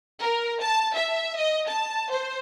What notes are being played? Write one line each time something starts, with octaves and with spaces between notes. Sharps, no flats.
A#4
A5
E5
D#5
A5
C5